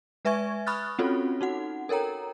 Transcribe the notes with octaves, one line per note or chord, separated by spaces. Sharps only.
G#3 B4 E5 G#5 C#6 G#6
B5 C#6 D#6 F6 F#6 A6
C4 C#4 F4 F#4 A4 C#5
D#4 F#4 F#5
A4 A#4 C#5 G5 A#5